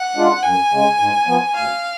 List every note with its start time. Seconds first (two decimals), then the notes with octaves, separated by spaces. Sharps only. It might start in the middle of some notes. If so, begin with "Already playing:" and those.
Already playing: F#5
0.15 G#3 D4 F4
0.43 F#2 G#5
0.72 C#3 G#3
0.99 G#2
1.27 F3 B3
1.55 D2 F5